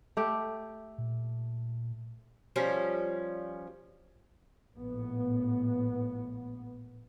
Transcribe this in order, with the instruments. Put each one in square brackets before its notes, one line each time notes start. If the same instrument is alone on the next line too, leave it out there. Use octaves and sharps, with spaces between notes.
[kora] A3 G4
[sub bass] A#2
[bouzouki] F3 G3 C#4
[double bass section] A#1 A2 B3